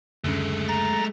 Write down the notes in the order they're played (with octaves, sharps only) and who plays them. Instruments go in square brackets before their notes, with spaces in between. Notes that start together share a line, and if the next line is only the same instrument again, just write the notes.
[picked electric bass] F#1 D2 C#3 [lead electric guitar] G#3 A3
[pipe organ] A#5 A6 A#6